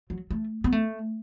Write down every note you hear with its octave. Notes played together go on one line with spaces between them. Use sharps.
F#3
A3
B3
A3